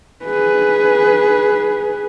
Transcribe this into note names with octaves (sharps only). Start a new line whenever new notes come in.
G#4 B4